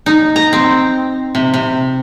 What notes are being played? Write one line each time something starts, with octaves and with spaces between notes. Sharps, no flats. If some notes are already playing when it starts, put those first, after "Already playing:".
D#4
A#5
C4
C3
C3